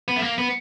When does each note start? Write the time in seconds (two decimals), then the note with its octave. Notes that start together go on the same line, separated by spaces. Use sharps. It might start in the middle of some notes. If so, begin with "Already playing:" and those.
0.08 B3
0.16 A3
0.23 A#3
0.38 B3